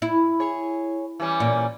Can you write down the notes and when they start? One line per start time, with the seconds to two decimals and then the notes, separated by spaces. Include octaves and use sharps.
0.02 E4
0.40 G#4 C#5
1.20 E3 G3 C#4
1.40 A#2